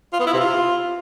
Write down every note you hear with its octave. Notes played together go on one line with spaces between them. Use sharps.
F4
B3
E4
C3
F4